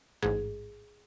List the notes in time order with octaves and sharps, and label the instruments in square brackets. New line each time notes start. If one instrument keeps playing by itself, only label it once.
[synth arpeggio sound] A1 G#2 [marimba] G#4